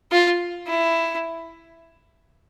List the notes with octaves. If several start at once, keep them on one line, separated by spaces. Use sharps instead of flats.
F4
E4